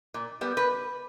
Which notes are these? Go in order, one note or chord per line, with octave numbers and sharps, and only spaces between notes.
A#2
G3 B3
B4